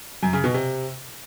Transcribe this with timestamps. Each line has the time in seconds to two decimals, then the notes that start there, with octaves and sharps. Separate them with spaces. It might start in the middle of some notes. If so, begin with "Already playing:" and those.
0.23 F#2
0.33 C#3
0.44 B2
0.54 C3